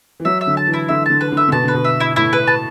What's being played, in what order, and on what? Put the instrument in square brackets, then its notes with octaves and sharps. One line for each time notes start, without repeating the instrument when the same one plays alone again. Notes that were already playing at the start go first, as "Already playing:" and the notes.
[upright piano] E3
[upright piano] F#3 [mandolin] E5
[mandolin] E5
[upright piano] D3
[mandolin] A5
[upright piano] E3
[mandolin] E4
[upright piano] D3 [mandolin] E5
[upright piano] D3 [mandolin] A5
[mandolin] B4
[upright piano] D3
[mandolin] E5
[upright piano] D3
[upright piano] B2 [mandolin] A5
[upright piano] D3 [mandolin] B4
[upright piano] B2
[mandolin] E5
E4
[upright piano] A2 [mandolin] E4
[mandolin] B4
A5